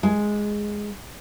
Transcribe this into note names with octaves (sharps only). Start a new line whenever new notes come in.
G#3